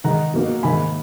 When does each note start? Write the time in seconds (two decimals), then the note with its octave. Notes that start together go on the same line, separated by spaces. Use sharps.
0.04 D#3 G#3 D#4 F#5 A#5
0.34 B2 F#3 A#3 D#4
0.63 G#2 D#3 A#3 G#5 B5